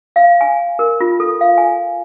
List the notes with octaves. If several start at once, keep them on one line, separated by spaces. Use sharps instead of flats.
F5
G#5
A#4
F4
A4
F5
G#5